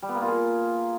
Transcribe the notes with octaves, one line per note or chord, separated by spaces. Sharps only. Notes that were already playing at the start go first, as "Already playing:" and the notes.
G3
B3
A#3
F4
G#4